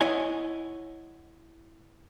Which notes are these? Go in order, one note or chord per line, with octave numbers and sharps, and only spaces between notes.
E4 C#5 D#5 F#5 G#5